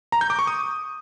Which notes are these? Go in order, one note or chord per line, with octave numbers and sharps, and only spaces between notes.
A#5
G6
D6
C#6
D#6